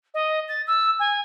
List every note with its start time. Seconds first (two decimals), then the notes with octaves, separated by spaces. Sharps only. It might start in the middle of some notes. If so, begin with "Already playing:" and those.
0.14 D#5
0.49 A6
0.67 E6
1.00 G#5